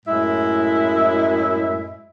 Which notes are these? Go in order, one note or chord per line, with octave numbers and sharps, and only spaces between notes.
F#2 A2 G#3 E4 E5